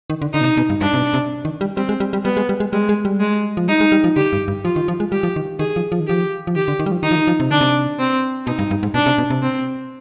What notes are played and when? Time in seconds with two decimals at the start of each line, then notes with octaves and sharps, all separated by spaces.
0.10 D#3
0.22 D3
0.34 D3 D#4
0.41 B2
0.45 C3
0.57 B2
0.70 G2
0.81 G2 D4
0.94 C3
0.98 B2
1.14 C3
1.45 D#3
1.61 G3
1.77 G3 C4
1.89 G#3
2.00 G3
2.13 G3
2.25 G3 B3
2.37 G#3
2.49 G3
2.60 G#3
2.73 G3 G#3
2.89 G#3
3.05 G3
3.20 G#3
3.57 F3
3.68 G3 D#4
3.81 G#3
3.92 G3
4.04 F3
4.16 D3 G4
4.33 G2
4.48 G2
4.65 F3 F4
4.76 D#3
4.88 F3
5.00 G#3
5.12 G3 G4
5.23 F3
5.36 D#3
5.59 D#3 G#4
5.76 F3
5.92 F3
6.00 D#3
6.07 F3 G4
6.47 F3
6.55 D#3 G4
6.68 D3
6.79 D#3
6.86 G3
6.92 F3
7.03 D#3 D#4
7.11 F3
7.16 D#3
7.27 F3
7.40 C3
7.50 D3 D4
7.61 C3
7.99 C4
8.47 B2 D#4
8.59 G2
8.71 G2
8.83 G#2
8.94 B2 D4
9.06 C3
9.18 B2
9.30 C3
9.42 C4